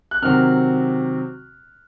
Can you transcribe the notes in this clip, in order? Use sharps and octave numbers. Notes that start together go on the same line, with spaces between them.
F#6
C3 D#3 F#3 C4 F6